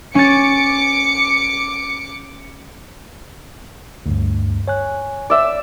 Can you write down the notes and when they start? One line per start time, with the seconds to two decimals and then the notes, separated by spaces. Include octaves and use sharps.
0.15 C#4 D6 A6 C#7
4.06 D2 G2
4.68 C#5 G#5 F#6
5.30 D5 E5 E6